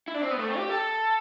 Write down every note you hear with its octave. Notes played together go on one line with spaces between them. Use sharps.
E4
D4
C4
B3
A3
C4
G4
A4